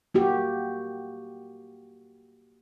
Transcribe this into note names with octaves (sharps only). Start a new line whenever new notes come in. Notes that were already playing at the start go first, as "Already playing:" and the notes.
A#3 F#4 G4